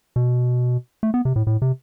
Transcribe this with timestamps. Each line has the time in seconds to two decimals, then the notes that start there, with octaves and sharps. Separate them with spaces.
0.16 B2
1.03 A3
1.14 B3
1.25 C3
1.36 A2
1.47 A2
1.62 C3